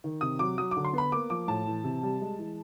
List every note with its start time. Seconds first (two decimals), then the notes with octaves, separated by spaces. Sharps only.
0.04 D#3
0.21 C3 D#6
0.39 F#3 D6
0.58 F#3 D#6
0.71 D6
0.77 D3
0.84 C6
0.93 B3 B5
1.12 A#3 D6
1.30 F3 D6
1.48 A2 A5
1.67 E3
1.84 C3
2.03 G3
2.21 G#3
2.38 E3